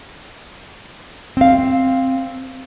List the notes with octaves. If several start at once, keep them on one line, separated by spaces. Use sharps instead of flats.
C4 F5